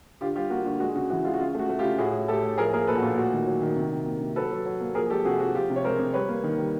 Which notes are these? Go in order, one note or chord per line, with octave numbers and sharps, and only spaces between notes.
D3 F4 G4
G3 F4 G4
A#3 F#4
D3 F#4
G#3 F#4
C#3 F#4
E3 F#4
G#3 F4
F#4
C#3 F4
A3 F#4
A3
F4 G4
C#3
A2 F#4 G#4
A2
A3 G4 A4
A2
F3 G#4 A#4
A#3 G#4 A#4
A#2 A4 B4
F#4
A#2 F4
A3 F#4
D#3
F#3
D#3
C3
C3
A#3
C3
F#3 A4 B4
F#3
F#3
A#3
F3 G#4 A#4
G#3 G4 A4
C3 F#4 G#4
F3 F#4
F3 F4 G4
C3
C#5
G#3 A#4 C5
C3
G3 B4 C#5
A#3
D#3
G3